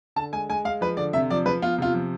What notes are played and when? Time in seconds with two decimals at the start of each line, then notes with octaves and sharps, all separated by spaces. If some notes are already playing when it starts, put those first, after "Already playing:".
0.16 D3 A5
0.32 G#3 G#5
0.49 G#3 G#5
0.65 G#3 F5
0.81 F3 B4
0.97 D3 D5
1.13 C3 E5
1.30 F3 D5
1.45 F3 B4
1.62 B3 F4
1.78 C3 F4
1.94 F3